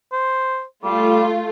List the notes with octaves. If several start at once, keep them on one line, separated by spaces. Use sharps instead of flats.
C5
G3 A3 F4